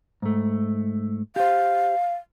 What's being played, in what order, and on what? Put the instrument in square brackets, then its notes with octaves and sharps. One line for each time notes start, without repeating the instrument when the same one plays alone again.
[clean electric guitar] G#2 A3
[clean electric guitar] G4 C5 [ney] F5